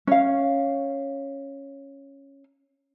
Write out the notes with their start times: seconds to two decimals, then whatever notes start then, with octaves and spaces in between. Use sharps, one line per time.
0.07 C#4 F5